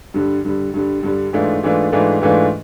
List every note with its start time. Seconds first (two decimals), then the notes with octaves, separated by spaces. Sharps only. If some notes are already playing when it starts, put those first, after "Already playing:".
0.14 G2 D3 G3
0.45 G2 D3 G3
0.74 G2 D3 G3
1.03 G2 D3 G3
1.33 G#2 E3 A3 D4 F4
1.63 G#2 E3 A3 D4 F4
1.92 G#2 E3 A3 D4 F4
2.22 G#2 E3 A3 D4 F4